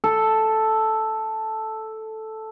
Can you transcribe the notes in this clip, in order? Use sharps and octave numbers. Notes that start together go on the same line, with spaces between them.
A4